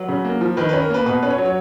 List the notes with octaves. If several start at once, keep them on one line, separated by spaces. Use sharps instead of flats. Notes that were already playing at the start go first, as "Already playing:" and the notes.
Already playing: F#3 B4
C#3
A#3
F3
D#3 B4
B4
C#4
A#4
A#3 B4
B2 B4
C#4 B4
C#5
F#3
C#5